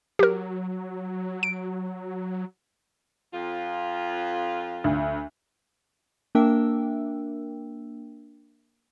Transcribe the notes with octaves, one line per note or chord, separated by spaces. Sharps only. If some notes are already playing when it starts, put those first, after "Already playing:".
F#3 G4 A#4
D7
F2 F4
D2
A#3 D4 A#4 E5 G5 E6